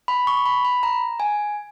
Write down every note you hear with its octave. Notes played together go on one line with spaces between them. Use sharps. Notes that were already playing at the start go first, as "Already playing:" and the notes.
B5
C#6
B5
B5
A#5
G#5